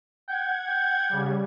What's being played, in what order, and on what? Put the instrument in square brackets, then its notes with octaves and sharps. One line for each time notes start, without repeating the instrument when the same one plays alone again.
[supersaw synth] F#5 G#6 [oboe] G5
[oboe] G5
[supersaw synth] C#3 G3